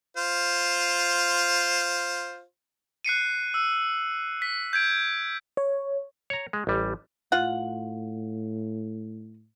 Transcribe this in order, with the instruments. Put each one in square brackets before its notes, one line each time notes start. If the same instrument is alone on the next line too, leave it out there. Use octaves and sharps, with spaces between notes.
[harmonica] F4 C5
[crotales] F#6 C7 C#7 D#7
E6
B6
G6 G#6 D7
[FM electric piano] C#5
[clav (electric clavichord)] C#5 A#5
G#3
A1 G3
[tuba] A2 [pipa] F4 F#5